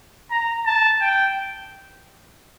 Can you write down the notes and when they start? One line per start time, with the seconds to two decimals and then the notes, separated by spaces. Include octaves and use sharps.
0.31 A#5
0.66 A5
1.01 G5